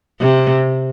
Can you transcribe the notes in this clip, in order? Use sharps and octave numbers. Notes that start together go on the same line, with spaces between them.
C3